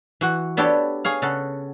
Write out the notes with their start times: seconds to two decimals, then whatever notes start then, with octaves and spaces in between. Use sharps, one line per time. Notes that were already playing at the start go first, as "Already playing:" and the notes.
0.21 E3 F#4 F#5
0.57 B3 D4 G4 A4 B4 C#5
1.05 G#4 C#5 F5
1.22 C#3 A4 F#5